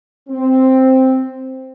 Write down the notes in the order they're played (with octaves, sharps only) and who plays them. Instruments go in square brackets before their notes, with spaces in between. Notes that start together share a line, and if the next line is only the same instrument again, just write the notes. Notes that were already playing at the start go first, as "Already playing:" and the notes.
[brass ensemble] C4